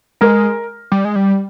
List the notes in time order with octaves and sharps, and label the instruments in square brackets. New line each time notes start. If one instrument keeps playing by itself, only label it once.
[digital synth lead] G#3 [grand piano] A#4
[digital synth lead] G3
G#3
G3